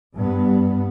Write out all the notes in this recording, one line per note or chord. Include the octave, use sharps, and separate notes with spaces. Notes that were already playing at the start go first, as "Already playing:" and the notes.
G2 B3